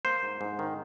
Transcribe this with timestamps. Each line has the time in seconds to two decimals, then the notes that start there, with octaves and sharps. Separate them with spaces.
0.05 A#3 C5
0.23 G#2
0.41 G#2
0.59 D#3